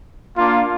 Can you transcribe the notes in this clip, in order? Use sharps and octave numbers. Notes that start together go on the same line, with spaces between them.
A#3 D4 F4